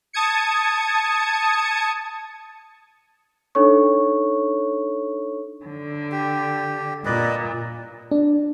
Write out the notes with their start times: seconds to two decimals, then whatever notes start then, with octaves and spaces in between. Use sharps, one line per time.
0.13 A5 D#6 G#6 C#7
3.55 D4 D#4 A4 C#5 C#6
5.65 D3
6.12 G4
7.05 A#2 B4 D5 D#5
8.11 D4